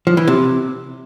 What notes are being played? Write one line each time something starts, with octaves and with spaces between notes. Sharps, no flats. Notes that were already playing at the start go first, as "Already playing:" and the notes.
F3
E3
C3